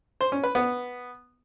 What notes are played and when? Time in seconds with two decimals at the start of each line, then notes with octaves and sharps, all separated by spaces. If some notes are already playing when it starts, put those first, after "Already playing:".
0.21 C5
0.32 C#4
0.43 B4
0.55 B3